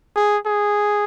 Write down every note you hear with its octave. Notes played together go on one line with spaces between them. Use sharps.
G#4
G#4